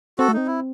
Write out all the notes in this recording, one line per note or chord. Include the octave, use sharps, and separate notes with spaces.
C4 F#4 A4
A3
C4 D#4
E4